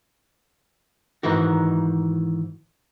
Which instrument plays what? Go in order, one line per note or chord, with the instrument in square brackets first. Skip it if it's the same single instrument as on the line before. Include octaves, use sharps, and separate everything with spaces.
[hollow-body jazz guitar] G#2 D#3 E3 F#4